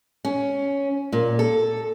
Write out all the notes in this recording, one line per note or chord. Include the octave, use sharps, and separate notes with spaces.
C#4
A#2
A4